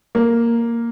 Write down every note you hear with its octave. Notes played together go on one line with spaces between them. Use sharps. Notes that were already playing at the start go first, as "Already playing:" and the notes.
A#3